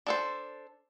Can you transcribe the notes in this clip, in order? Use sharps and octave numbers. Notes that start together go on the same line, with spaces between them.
D4 A4 C5